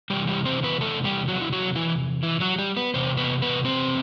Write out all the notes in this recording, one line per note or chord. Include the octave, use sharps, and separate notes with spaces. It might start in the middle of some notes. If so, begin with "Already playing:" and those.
E2 C3 E3 G3 G4
G3 G4
C4 C5
B3 B4
A3 A4
G3 G4
F#3 F#4
E4
F#3 F#4
E3 E4
E3 E4
F#3 F#4
G3 G4
B3 B4
E2 C3 C5
B3 B4
B3 B4
C4 C5